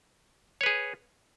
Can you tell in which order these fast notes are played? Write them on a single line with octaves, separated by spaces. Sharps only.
C#5 B4 G#4